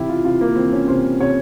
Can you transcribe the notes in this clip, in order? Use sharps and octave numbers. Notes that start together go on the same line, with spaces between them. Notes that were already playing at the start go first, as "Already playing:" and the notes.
Already playing: C3 E3 E4 G4
F4
C3 F4
A#3
E3 C4
C#4
C3 C5
C3 C#5